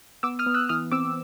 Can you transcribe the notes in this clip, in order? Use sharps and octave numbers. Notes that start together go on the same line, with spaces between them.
B3 D6 E6
D#6 F6
B3
E6 F#6
E3 D#6 F6
C4 D6 E6